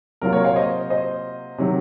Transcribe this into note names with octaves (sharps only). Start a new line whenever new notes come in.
C3 F#3 A#3 F4 A#4
A#4 C#5
C#5 F5
C5 D#5
C5 D#5
C3 D#3 F#3